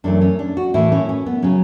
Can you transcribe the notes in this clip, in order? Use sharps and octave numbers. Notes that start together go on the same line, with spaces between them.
F#2 E3 A3 D4
C#4
D4
F#4
A2 E3 A3 E4
C#4
C#4
B3
C#3 F#3 C#4